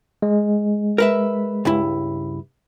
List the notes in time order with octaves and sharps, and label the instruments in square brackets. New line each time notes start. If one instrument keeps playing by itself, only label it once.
[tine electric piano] G#3
[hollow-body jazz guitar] A#4 B4 E5
C#2 G2 E4